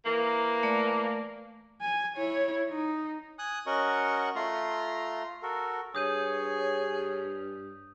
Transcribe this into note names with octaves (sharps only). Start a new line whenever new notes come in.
E3 A#3
A3 D5
G#5
E4 C#5
D#4
G#5 D#6 F#6
C#4 F#4 A#4 D#5 F#5 C#6
A3 F4 A#5 C6
F#4 A4 A#4
G2 G#4 C#5 D#6 G6 D#7